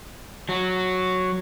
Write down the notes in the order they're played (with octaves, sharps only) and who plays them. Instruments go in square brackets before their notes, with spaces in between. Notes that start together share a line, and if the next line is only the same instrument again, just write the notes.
[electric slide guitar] F#3